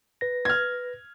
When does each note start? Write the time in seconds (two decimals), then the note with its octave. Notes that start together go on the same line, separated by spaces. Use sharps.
0.21 B4 A#6
0.45 F6 G#6